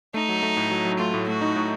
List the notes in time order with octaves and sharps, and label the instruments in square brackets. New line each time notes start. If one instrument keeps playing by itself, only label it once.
[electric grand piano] A3 [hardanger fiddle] D#4
[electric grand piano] F#3
A3
A2
F#3
F#3
[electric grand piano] A3 [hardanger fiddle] F4
[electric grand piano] A2
[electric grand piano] A3 [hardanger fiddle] F#4
[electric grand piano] D#4
A2